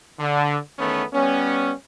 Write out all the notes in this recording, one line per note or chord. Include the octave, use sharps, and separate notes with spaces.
D3
E2 D#3 A3 B3 C#4
G3 B3 C#4